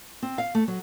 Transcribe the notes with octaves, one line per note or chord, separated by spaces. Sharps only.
C4
F5
A3
F#3